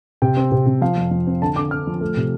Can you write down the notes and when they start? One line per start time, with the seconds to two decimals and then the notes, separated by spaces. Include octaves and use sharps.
0.22 C3 G5
0.37 C4
0.52 C3
0.66 C3
0.81 F3 F5
0.97 F2
1.11 F3
1.27 C4
1.42 D3 A5
1.56 D3 D6
1.71 D3 F6
1.87 F3
2.01 A3
2.17 C3